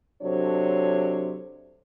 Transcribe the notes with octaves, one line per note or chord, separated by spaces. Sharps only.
C3 F#3 D4 A4 C5 C#5